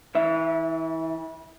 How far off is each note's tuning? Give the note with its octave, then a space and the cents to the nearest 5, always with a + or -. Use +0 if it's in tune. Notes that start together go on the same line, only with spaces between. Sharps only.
E3 -30 E5 +5